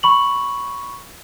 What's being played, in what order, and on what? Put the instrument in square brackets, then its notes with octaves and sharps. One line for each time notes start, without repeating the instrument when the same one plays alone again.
[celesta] B5 C#6 F#7